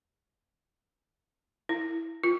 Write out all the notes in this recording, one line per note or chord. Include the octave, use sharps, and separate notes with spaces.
E4
F4